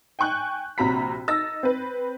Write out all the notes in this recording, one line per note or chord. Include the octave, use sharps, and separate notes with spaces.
G5 G#5 C#6 F#6 G6
A#1 C3 F#4 A#5 B5 B6
D#4 E6 A6 A#6
C4 B4